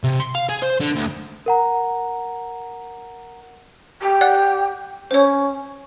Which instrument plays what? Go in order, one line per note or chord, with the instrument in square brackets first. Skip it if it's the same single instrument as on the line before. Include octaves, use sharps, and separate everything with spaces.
[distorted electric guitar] C3
C6
F5
G#4
C5
D3
D2
[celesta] A#4 F#5 A#5
[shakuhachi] G4
[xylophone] D5 F#5 F#6
[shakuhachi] C#4 [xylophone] C5 C#5